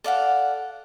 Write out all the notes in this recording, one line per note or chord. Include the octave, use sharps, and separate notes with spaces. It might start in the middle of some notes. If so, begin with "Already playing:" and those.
A4 D5 F5 F#5